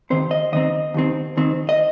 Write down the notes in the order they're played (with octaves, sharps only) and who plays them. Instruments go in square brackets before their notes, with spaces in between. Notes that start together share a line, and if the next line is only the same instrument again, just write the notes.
[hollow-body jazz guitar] D#2 D#3 C4 C5
D#5
D#2 D#3 C4 D#5
D#2 D#3 C4
D#2 D#3 C4
D#5